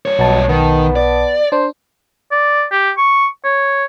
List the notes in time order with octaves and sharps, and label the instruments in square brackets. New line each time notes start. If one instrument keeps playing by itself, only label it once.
[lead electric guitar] G2 C#5
[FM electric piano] B1 A5 [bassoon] B2
[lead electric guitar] D#3 [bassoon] B3
[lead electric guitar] D5
[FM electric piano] D4 [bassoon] C5
[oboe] D5
G4
C#6
C#5